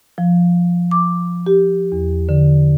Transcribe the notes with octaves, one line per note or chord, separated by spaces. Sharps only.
F3
D6
G4
E2
D3